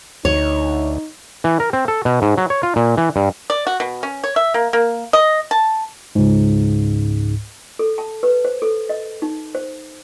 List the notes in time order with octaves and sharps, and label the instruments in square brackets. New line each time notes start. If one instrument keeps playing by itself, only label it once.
[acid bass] D2 [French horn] D#4 [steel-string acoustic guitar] C#5
[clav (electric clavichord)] E3
A#4
C4
A4
B2
G#2
F#3
C#5
F4
A#2
E3
G2
[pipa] D5
F#4
B2
C#4
C#5
E5
A#3
A#3
D#5
A5
[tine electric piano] C#2 G#2
[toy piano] A4
A5
B4
C5
A4
D#5
D#4
C5